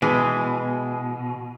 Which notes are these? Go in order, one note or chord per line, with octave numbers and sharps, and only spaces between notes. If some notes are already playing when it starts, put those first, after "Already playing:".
B2 E3 G#3